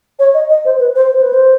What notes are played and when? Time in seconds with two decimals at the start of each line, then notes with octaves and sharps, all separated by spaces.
0.19 C#5
0.34 D#5
0.49 D#5
0.65 C5
0.80 B4
0.95 C5
1.11 C5
1.22 B4
1.33 C5